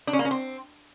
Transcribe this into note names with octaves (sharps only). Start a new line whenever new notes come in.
D4
C#4
A#3
C#4
C4